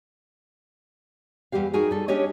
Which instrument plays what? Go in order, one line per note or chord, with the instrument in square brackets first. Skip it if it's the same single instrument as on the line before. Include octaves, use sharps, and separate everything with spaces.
[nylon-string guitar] E2 E3 G3 G4 F5
D#4 F#4 G#4 A#4
G3 A4
C#4 D4 G4 C#5 D#5